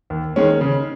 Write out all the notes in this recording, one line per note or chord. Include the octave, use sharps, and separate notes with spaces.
D#2
D#3 G#3 C#4
C#3